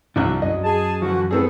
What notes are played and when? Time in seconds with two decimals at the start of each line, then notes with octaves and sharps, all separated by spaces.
0.16 C2 F3 D4 F#4 E5 F#6
0.42 F#2 F#3 D#5
0.64 G#4 A5
1.02 D3 E3 F3 F#4
1.31 B3 C4 G#4 A4